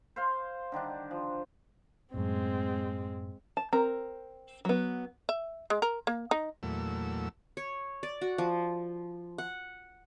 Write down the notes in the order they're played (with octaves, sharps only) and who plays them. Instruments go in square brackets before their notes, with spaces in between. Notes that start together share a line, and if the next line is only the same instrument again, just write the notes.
[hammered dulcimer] C5 F5 C6
D3 D#3 G3 D4
F3
[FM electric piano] F#2 A2 [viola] G#3 C4
[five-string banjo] A5
C4 A#4 A#5
F#3 B3
[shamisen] E5
G#3
A#4
A#3
D#4
[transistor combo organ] E2 A#2 F#3 A3 E6
[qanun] C#5
D5
F#4
F3
F#5